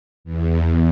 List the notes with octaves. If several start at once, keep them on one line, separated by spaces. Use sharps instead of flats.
E2